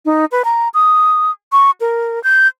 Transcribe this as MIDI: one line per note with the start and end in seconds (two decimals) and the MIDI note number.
0.05 0.25 63
0.32 0.42 71
0.45 0.68 82
0.74 1.31 87
1.52 1.71 85
1.81 2.22 70
2.24 2.47 91